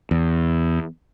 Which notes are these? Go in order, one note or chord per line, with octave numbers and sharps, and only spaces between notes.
E2